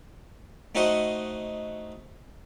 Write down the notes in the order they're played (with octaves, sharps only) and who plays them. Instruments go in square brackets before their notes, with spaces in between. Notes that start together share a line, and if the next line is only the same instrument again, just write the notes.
[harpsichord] A3 D#4 F#4 C5 D#5 F#5